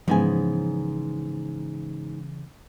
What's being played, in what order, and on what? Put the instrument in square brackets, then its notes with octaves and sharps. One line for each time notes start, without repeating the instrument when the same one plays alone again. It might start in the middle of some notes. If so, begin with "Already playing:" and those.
[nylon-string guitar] G#2 B3 G#5 [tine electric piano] C#3 E3 [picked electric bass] F3